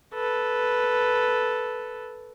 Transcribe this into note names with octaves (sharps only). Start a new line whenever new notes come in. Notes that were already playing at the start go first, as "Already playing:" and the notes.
A4 B4